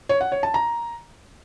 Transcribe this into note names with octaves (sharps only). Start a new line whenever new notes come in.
C#5
F#5
C#5
A5
A#5